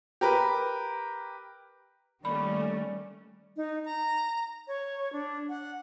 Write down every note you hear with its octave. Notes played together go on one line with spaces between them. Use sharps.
G4 A#4 B4
D#3 G3 A3 A#3 C#4 D5 B5
D#4
A#5
C#5
D4
F#5